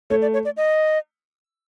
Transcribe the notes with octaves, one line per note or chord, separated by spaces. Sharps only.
A3 C#5
D5
C#5
D5
D#5